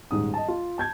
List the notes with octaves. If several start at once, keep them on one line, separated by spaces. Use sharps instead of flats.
D#1 G#2 D#6
D#5 A5
F4
A5 G6 G#6